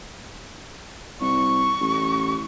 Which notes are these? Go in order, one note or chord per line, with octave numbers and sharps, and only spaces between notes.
C2 C#6
A1